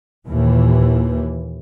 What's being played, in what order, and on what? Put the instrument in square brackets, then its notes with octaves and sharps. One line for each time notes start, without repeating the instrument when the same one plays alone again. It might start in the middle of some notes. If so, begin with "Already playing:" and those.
[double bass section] D#2 A#2 E3